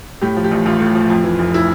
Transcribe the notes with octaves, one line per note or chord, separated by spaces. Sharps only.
A2 G4
F3
G4
A1
A1 F4
A2
F3
F2
E3
F1
E4